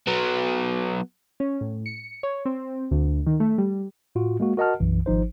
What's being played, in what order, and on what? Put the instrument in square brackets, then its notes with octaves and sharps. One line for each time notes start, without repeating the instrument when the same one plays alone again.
[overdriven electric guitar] F#3 B3
[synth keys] C#4
A2
C#7
C#5
C4
D2
D#3
A3
G3
[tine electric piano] A2 F4 F#4
G#3 A#3 F#4
F#4 A#4 D#5 F#5 A5 F6
B1 F#2 E3
G#1 F3 D#4 C5